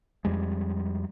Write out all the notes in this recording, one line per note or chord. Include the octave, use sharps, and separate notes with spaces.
F2 G3 G#3